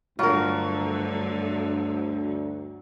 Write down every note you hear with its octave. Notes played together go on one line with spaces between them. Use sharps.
D2 G2 D3 F#3 F4 A#4